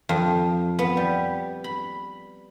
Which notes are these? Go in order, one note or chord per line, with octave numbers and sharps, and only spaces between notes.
F2
B3
G3
B5